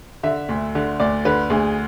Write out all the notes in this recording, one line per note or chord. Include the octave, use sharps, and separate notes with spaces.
D3 E5
D2
D3
D2 D5
D3 B4
D2 G#4